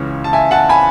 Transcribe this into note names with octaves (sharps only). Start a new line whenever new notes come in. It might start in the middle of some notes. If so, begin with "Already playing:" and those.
Already playing: C#2 C#3 E3 C#4
A5
E5 G#5
F#5 A5
G#5 B5